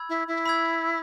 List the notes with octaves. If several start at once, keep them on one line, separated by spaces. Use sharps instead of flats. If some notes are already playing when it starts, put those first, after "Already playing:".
Already playing: B5 E6 G#6
E4
E4
B5 E6 G#6